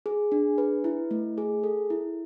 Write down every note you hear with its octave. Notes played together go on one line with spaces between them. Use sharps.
G#4
D4
B4
E4
A3
G#4
A4
E4